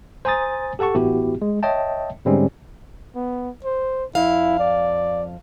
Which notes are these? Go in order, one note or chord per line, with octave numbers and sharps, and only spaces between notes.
C5 G#5 A#5 D#6 A6
G4 A4 F#5 A5 C#6
A1 B3 E4 F#4 G4
G#3
C#5 D#5 E5 G5 A5
G#2 D3 G3 G#3 C4 C#4
B3
C5
F2 E4 F5
D5